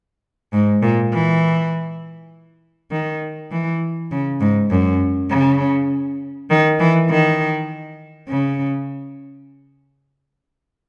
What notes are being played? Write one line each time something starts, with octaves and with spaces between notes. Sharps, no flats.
G#2
A#2
E3
D#3
E3
C#3
G#2
F#2
C#3
D#3
E3
D#3
C#3